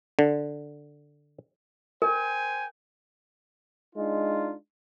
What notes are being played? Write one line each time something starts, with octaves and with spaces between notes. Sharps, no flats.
D3
A#4 C5 G5 G#5
G#3 D4 D#4 F4